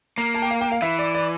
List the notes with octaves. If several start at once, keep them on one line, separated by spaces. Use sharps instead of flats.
A#3 A#5
A5
G5
F5
G5
F5
E3 E5
D5
D5